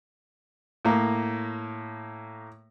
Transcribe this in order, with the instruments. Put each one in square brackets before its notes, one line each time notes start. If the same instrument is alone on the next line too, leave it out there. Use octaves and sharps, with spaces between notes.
[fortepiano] A2 A#3